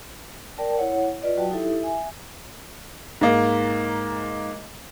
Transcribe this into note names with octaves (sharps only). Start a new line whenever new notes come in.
A#4 D5 G5 A5
E4 C#5 F#5
F4 B4 D5 D#5
F#3 F#4 G5 A5
D#4 E4 G4 A4 E5
E5 G#5
G#2 A#3